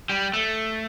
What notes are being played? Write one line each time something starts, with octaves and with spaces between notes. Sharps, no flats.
G3
A3